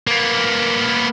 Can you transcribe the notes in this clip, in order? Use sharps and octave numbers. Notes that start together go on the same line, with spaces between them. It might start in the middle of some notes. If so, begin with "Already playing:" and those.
A#3 B3